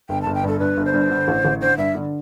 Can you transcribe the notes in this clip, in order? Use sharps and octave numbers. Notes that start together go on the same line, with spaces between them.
G1 G5
G1 A5
G5
G2 A4
G2 B4
G1
C5
G2
D3
A1
A1
D3 C5
G2 E5
D3